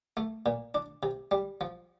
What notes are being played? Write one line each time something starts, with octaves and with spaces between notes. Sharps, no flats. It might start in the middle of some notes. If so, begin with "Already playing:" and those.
A3
A#2
D4
C3
G3
F3